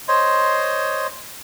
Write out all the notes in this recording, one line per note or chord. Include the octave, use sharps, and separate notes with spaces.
C5 C#5 D#5 C6